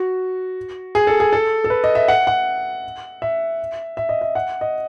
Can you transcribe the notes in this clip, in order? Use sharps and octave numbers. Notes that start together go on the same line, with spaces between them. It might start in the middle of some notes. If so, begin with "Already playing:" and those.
Already playing: F#4
G#4
A4
G#4
A4
A4
B4
D#5
E5
F#5
F#5
E5
E5
D#5
E5
F#5
D#5